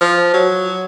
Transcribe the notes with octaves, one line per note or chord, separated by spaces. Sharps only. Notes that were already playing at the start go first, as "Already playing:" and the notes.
F3
F#3